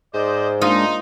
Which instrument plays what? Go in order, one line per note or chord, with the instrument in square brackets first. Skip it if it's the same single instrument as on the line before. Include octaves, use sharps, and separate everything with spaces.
[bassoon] G#2 [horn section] C5 D#5 [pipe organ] D5
[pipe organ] G#3 A#3 D4 [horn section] D#4 [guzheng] F4